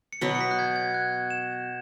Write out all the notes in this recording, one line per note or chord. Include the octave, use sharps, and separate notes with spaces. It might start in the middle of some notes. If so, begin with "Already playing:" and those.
C#7
B2 F#3 B3 B6
C#7
B6
F#6
G#6
G#6
F#6
E7